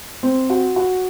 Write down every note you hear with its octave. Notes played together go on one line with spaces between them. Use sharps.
C4
F#4
F#4